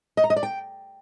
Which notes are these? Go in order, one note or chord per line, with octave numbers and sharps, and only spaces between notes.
D#5
A#5
D#5
D5
G5